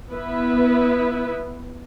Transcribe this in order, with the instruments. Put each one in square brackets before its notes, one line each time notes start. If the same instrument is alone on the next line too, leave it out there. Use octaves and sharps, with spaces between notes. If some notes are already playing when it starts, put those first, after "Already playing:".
[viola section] B3 E4 B4